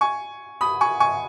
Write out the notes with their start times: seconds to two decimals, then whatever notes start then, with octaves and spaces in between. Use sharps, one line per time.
0.01 G#5 C#6
0.61 B5 D#6
0.81 G#5 C#6
1.00 G#5 C#6